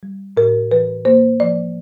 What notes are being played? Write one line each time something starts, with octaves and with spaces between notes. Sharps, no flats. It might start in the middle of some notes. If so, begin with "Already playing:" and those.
G3
A2 A#4
E3 B4
A#3 C5
F3 D5